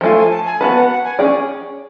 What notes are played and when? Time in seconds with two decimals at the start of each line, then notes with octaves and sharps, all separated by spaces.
0.01 F3 A3 F4 G#5
0.17 G#5
0.31 A5
0.46 G#5
0.60 B3 F#4 B4 A5
0.75 F#5
0.89 F#5
1.04 G#5
1.19 C#4 G#4 D5